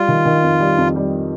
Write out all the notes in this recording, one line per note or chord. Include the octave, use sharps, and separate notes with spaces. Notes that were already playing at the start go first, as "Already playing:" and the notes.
Already playing: G3 F4
D#3
D#3
F2
G3
F2
G3